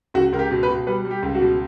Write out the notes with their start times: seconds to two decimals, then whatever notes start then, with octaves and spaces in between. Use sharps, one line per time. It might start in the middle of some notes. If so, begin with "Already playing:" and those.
0.14 C#2 F#4
0.33 C#2 A#4
0.39 G4
0.51 B2
0.63 B4
0.68 B2
0.87 G3 B4
1.05 G3
1.11 G4
1.23 C#2
1.35 F#4
1.41 B2